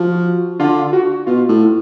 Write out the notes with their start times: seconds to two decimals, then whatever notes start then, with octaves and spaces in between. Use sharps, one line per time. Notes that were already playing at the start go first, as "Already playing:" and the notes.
Already playing: F3 F#4
0.59 D3 F4
0.93 F#4
1.27 B2 F4
1.49 A2